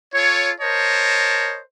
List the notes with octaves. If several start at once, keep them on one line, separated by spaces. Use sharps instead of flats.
F4 A4 C#5
A#4 C5 C#5 D#5 A5